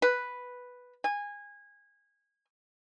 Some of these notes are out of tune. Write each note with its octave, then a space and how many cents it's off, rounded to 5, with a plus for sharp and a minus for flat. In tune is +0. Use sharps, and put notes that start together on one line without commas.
B4 +0
G#5 -20